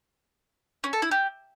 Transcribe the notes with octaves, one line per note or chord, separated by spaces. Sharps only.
C#4
A4
E4
G4